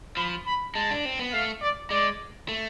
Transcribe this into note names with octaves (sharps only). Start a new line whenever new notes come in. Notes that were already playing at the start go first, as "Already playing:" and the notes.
F3 B5
B5
G#3 A5
D4
C4
B3
A3 F5
D5
G#3 D5
A3